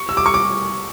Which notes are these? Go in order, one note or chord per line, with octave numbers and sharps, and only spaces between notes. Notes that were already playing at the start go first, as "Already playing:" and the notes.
Already playing: C#6
E6
D6
C#6
D6